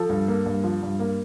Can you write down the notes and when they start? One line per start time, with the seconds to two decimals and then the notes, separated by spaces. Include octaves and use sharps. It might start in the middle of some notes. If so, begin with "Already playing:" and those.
Already playing: F3 A4
0.09 G2
0.28 A#3
0.46 G2
0.64 F3
0.83 G2
0.99 A#3